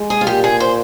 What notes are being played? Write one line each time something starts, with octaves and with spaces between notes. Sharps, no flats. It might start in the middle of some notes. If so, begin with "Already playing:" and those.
Already playing: G#3
G#4
F4
A#2 G4
G#4
C5